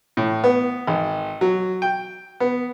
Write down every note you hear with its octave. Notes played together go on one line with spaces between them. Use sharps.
A2
B3
G#1
F#3
G5
B3